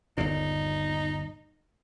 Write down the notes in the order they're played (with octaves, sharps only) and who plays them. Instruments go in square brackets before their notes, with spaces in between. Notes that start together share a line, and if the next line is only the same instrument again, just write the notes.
[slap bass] G1 D#2 A#2 [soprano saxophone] D#4